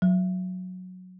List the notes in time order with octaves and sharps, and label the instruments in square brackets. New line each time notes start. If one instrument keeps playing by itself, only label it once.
[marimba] F#3